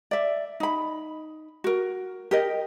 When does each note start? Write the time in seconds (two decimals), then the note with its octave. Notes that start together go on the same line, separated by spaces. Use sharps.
0.11 D5 E5
0.60 D#4 B5
1.64 F#4 A#4
2.31 G4 A#4 D#5